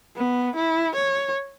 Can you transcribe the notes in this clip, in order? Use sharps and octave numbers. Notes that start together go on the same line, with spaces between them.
B3
E4
C#5